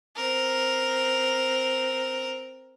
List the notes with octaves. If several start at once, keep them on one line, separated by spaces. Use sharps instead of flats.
C4 A#4